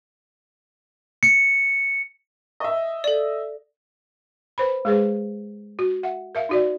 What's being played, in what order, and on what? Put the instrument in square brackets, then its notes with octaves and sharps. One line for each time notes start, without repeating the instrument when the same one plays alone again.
[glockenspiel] C#7
[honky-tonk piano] D#5 E5
[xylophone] A4 D5
[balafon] B4 C5 B5
G#3 G#4 B4 C5
F#4
E5 F#5
A#4 E5 F5
D#4 F#4 D5